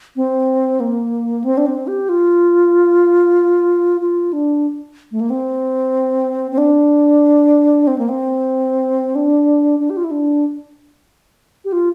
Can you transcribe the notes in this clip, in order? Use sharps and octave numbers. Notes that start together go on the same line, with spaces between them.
C4
A#3
C4
D4
C4
G4
F4
F4
D4
A3
A#3
C4
C4
D4
C4
A#3
C4
D4
D4
G4
F4
E4
D4
G4
F4